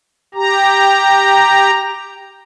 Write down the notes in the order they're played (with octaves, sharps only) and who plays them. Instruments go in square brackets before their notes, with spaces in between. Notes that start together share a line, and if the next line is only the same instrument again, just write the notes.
[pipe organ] G4 A#5